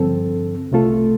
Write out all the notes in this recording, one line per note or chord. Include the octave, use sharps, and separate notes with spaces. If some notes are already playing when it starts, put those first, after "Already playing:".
Already playing: G2 D3 F3 C4 A4
C2 C3 A3 F4 A4